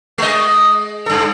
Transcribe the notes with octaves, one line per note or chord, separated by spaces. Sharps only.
G#3 D#5
G2 A4